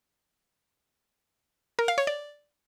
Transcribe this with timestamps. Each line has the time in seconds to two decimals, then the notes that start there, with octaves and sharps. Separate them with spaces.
1.79 A#4
1.88 F5
1.98 C#5
2.07 D5